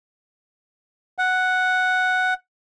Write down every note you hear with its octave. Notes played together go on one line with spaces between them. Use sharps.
F#5